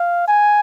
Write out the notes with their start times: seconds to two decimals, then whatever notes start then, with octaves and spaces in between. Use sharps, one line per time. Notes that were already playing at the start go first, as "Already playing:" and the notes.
Already playing: F5
0.28 G#5